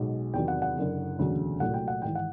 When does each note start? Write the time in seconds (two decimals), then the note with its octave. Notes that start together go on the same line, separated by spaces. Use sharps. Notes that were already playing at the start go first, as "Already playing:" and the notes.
Already playing: B1 B2 G#3
0.34 E2 C3 D#3 F#3 G5
0.48 F#5
0.62 F#5
0.76 F#1 F#2 D3
1.19 E1 D2 C#3 F#3
1.60 C2 A#2 F#3 A3 F#5
1.74 G5
1.88 F#5
2.02 G#1 G#2 E3 G5
2.15 F#5